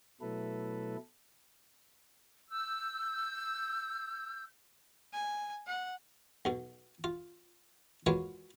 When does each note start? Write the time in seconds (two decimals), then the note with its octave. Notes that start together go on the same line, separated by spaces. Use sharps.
0.21 B2 F#3 A3 E4 A4 B4
2.50 E6 G6
5.13 G#5
5.67 F#5
6.45 B1 B2
7.04 F4
8.06 G#3 A#3 F4 F#4 B4 C#5